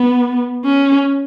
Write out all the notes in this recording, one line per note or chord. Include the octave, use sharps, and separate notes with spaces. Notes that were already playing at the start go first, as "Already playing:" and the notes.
Already playing: B3
C#4